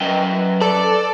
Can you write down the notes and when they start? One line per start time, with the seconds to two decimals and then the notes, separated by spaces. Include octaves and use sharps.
0.01 F#2 B4 D#5 G5
0.24 B4
0.61 A4 D5